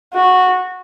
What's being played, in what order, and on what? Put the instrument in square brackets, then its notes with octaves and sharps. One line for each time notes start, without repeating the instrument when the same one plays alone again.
[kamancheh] F#4